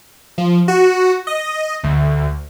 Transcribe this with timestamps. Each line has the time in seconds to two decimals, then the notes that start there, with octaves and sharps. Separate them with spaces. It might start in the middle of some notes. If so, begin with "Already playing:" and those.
0.38 F3
0.68 F#4
1.27 D#5
1.83 D2